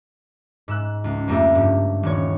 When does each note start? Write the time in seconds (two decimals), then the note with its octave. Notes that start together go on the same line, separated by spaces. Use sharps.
0.68 G#2 E6 F#6
1.04 C#2
1.28 F2 A3 A#3 G4
1.55 G2
2.03 D#1 C#5